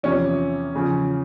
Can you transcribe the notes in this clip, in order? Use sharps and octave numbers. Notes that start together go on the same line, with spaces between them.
E2 C3 F3 C#4
E2 C#3 F3